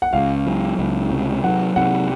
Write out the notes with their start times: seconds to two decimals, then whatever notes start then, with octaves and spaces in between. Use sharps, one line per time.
0.02 F#5
0.13 C#2 F5
0.46 F#3
0.79 C#2
1.11 C3
1.44 F#3 F#5
1.76 C3 F#5